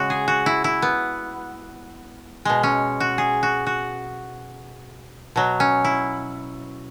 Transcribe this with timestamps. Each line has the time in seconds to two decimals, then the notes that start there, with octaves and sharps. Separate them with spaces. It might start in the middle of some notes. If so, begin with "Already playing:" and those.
Already playing: C#3 G#3 F#4
0.10 G#4
0.28 F#4
0.46 E4
0.64 E4
0.82 B3
2.45 B2 G#3
2.63 C#4
3.00 F#4
3.18 G#4
3.43 F#4
3.67 F#4
5.36 B2 F#3
5.60 C#4
5.85 E4